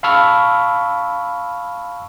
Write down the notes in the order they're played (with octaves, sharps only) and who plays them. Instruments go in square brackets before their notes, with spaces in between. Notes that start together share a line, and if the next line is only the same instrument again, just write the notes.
[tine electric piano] F5 A5 B5 C#6 E6 F6